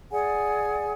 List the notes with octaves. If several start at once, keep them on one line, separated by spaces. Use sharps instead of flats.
G#4 D5 F#5 G#5